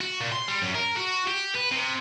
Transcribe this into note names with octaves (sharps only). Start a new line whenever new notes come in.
F#4
A#2
C6
G3
F#2
A#4
F#4
G4
B4
C3